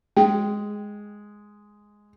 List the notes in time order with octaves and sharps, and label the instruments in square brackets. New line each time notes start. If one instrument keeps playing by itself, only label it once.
[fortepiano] G#3 [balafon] G5